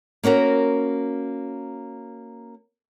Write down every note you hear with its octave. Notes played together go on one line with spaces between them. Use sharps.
A#3 C#4 F#4 A#4